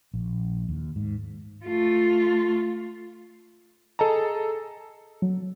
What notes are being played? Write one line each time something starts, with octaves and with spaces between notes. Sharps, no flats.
A#1
D#2
G#2
A3 F4
G#4 A4 D#5 A5 A#5
F#3